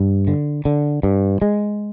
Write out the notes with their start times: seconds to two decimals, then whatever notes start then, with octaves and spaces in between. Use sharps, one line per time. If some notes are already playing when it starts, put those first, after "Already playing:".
Already playing: G2
0.27 D3
0.65 D3
1.03 G2
1.42 G#3